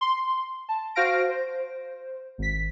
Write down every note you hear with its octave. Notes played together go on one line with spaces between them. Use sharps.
C6
A5
F#4 C5 F5 F6 A#6 D7
C5
G#1 B6